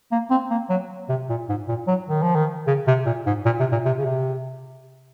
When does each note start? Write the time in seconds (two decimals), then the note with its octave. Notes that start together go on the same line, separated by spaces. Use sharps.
0.12 A#3
0.30 C4
0.51 A#3
0.70 F#3
1.09 C3
1.29 A#2
1.49 G#2
1.68 A#2
1.88 F#3
2.08 D#3
2.22 F3
2.35 D#3
2.67 C#3
2.87 C3
3.06 A#2
3.26 G#2
3.45 A#2
3.59 C3
3.72 A#2
3.85 C3
3.99 C#3
4.05 C3